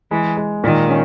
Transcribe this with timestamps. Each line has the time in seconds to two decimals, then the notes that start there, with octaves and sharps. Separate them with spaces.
0.11 E3 G#3
0.37 G#3
0.63 A#2 D#3
0.89 C#4